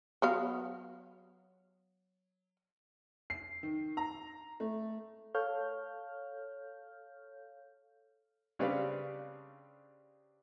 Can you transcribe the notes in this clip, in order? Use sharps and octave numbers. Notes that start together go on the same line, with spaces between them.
F#3 B3 F5
C7
D#3
A#5
A3
A4 C#5 F5 F6 G6
C#3 G3 C4 D4 B4 F5